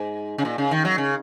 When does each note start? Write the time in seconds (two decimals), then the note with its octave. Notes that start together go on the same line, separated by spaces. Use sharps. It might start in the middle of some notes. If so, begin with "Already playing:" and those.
Already playing: G#2
0.38 C#3
0.45 A#2
0.58 C#3
0.71 D#3
0.85 F#3
0.98 C#3